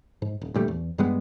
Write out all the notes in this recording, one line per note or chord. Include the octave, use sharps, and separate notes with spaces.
G#2
D#1
D2 A#2 G3 A3
E2
G2 G3 G#3 B3